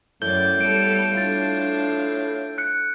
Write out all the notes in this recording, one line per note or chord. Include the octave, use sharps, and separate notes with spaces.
F#2 A2 D5 G6 G7
G3 B3 A4 D7
D4 F4 A6
F#6 C#7